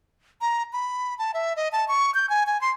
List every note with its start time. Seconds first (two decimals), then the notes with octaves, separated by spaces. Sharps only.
0.41 A#5
0.73 B5
1.19 A5
1.34 E5
1.56 D#5
1.72 A5
1.88 C#6
2.14 G6
2.30 G#5
2.47 G#5
2.61 C6